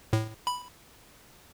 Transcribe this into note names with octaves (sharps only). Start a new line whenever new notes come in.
A2
B5